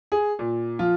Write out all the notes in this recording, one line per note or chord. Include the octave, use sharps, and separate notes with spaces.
G#4
A#2
F3 F4